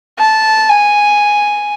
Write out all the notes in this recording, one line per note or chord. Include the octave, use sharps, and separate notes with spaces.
A5
G#5